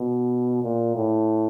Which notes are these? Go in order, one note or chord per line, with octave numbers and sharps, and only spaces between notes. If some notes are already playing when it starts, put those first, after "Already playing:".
Already playing: B2
A#2
A2